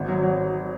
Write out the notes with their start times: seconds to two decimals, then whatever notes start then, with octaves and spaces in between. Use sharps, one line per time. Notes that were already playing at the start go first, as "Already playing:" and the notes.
Already playing: G#1
0.08 F#3
0.23 F#3